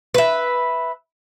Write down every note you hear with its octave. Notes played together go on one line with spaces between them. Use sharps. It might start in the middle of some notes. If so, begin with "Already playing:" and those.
B4 E5